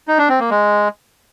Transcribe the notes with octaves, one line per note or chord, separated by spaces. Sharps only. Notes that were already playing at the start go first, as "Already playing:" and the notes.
D#4
D4
C4
A#3
G#3